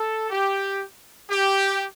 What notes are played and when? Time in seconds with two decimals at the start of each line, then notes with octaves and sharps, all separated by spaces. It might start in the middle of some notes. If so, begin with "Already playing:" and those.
Already playing: A4
0.30 G4
1.30 G4